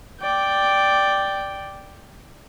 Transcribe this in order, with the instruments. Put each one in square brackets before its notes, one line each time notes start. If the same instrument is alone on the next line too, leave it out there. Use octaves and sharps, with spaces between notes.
[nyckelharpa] D5 G5